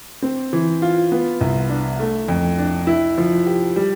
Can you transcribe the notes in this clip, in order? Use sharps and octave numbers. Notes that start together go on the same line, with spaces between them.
C4
E3
F4
B3
C2
D4
A3
F2
D4
E4
F3
G4
G3